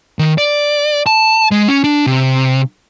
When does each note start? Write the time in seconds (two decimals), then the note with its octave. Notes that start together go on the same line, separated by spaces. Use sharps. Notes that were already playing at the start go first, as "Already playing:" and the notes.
0.19 D#3
0.38 D5
1.06 A5
1.51 G#3
1.68 C#4
1.84 D4
2.06 C3